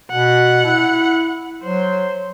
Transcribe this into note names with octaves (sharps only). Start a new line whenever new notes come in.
B2 F#5
E4
F#3 C5